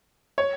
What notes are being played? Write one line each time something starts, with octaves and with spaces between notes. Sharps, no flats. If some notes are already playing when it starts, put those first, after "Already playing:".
C#5